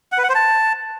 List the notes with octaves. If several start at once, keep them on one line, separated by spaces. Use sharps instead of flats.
F#5
B4
F#5
C5
A5